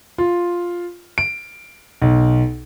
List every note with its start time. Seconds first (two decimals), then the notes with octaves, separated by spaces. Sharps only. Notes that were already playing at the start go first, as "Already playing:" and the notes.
0.18 F4
1.18 D7
2.02 B1